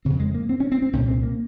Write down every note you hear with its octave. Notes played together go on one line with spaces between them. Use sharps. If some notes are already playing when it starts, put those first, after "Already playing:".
F2 C#3 C4
G#3
A#3
C4
C#4
C4
C4
C2 A#2 C#4
C4
A#3